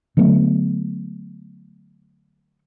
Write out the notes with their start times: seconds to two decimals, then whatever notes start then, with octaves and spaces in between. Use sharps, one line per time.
0.17 D3 F#3 A3 B3